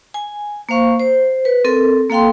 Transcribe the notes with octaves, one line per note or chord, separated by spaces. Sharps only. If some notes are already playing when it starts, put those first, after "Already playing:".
G#5
A#3 C5 F5 C#6
C5
B4
C4 A4 A#4
A#3 A4 F5 G5 C6